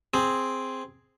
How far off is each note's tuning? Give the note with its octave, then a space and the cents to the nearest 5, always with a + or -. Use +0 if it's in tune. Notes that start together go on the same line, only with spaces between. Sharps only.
C4 +0 G#4 +0